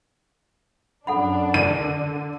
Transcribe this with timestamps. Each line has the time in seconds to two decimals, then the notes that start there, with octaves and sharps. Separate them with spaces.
1.07 F#2 D4 A4 F#5 B5
1.54 D3 D#7